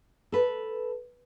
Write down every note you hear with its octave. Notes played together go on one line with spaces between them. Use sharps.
A4 B4